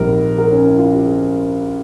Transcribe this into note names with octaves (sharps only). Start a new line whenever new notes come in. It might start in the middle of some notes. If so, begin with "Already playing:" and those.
Already playing: A#1 G#2 G3 C4 A#4
A#4
C#4
E4
F4
G4
G#4